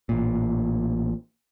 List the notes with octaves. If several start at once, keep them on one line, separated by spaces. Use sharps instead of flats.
A1 A#2